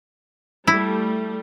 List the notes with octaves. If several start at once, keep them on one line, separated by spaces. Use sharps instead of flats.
G3 A3 E4